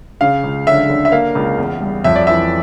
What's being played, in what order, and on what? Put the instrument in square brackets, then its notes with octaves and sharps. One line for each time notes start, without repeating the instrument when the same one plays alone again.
[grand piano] C#3 [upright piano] F5
[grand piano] C#2
[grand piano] D3 [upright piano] E5
[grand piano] D3
[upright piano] E5
[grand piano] A#3 [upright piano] F5
[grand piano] C#2
E2
G3
[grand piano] F2 [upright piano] E5
[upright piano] D5
[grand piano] E3 [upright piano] E5